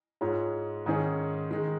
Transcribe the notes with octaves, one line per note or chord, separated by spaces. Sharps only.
G#2 G#3 F4 C#5
G#2 D#3 C#4 G#4
D#3 G#3